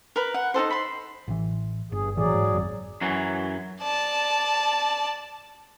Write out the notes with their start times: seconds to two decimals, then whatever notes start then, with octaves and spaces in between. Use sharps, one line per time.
0.16 A#4 B4
0.34 F#5
0.54 D#4 F#4 A4 C5
0.70 B5 C6
1.28 A1 E3
1.92 G1 G2 G#4
2.17 A#1 A2 E3 F#3 G#4 D5
2.34 G#2
2.55 G#1 F#2
3.01 F#2 E3 F#3
3.80 D5 A5